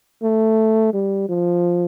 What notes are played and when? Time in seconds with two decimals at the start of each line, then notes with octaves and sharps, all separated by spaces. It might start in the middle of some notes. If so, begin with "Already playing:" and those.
0.23 A3
0.93 G3
1.29 F3